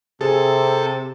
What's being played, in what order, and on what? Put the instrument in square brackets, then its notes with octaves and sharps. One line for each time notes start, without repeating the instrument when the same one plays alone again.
[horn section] C3 [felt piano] G#4 [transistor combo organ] A4